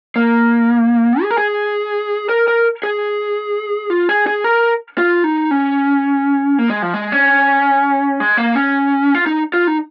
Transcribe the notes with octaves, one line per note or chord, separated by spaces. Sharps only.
A#3
G#4
A#4
G#4
A#4
A#4
G#4
F4
G#4
G#4
A#4
F4
D#4
C#4
A#3
G#3
F3
G#3
C#4
G#3
A#3
C#4
F4
D#4
F4
D#4